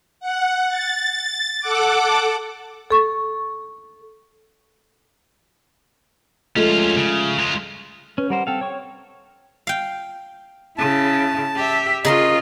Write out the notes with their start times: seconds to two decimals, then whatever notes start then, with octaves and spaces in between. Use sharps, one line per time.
0.20 F#5
0.68 A6
1.60 A4 F#5 D6
2.91 A4 C#6
6.56 F3 G#3 A3 C#4 F4
6.97 C#3
7.39 G#3 F4
8.18 C#4 B4
8.30 G3 A#4 C5 F#5
8.47 C4 A4 F5 G5
8.61 C#5 C#6
9.67 F5 G5
10.78 C#3 E4 A5
11.56 G4 E5
12.05 C#3 F4 G#4 A#4 D#5 C6